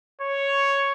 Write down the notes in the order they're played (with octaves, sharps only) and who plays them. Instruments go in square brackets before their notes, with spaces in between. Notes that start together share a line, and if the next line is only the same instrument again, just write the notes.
[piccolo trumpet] C#5